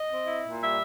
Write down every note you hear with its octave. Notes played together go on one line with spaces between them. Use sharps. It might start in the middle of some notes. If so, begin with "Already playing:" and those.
Already playing: D#5
C4
E4
A#2
G3 E5